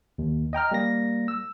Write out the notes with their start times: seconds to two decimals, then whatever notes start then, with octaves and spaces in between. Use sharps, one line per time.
0.18 D#2
0.53 D#5 G5 A#5 F6
0.71 G3 A#3 A#6
1.28 E6